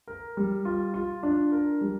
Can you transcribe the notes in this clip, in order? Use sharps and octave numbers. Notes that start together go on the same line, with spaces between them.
A#4
G3
F4
F4
D4
A#4
G3